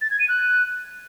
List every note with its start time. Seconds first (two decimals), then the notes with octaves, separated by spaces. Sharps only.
0.01 A6
0.10 G#6
0.20 D#7
0.29 F#6